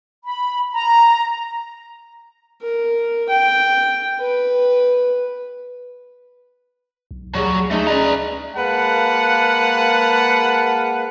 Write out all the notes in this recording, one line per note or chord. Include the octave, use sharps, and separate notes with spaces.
B5
A#5
A#4
G5
B4
B1
D2 A#2 F#3 G3 G#4 C#6
G#3 A3 D4 D#4 G#4
C#4 B4 D5 D#5 A#5
G#3 A#3 B4 F5 F#5 A5